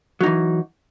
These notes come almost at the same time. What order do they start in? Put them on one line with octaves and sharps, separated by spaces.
F#3 D#4 E3